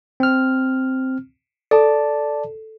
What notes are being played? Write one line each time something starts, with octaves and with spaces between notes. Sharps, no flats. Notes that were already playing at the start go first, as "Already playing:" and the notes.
C4 F6
A4 D5 A5